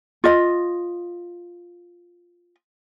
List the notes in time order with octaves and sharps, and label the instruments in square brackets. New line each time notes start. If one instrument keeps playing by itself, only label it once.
[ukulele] F4 D#5